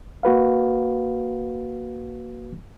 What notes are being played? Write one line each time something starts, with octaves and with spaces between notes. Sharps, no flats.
A#3 F#4 B4 F5